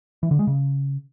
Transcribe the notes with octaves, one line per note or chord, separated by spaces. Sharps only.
E3
D3
G#3
C#3